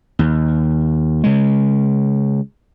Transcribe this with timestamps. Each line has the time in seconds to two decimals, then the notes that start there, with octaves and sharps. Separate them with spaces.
0.19 D#2
1.24 C#3 G#3